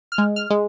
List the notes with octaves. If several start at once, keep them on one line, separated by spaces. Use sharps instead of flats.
F6
G#3
F6
G#3